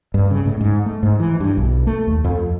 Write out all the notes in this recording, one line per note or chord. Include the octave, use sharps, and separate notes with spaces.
G2
C#3
A2
G#2
A3
G#2
E3
G2
B1
A3
D#2
F2